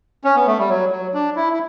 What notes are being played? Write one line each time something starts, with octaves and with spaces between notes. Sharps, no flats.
C#4
B3
A3
G3
F#3
F#3
D4
E4
E4